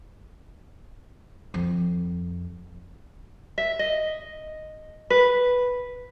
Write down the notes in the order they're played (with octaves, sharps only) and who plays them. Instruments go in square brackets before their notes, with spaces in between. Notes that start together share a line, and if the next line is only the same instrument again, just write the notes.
[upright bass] F2
[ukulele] E5
D#5
B4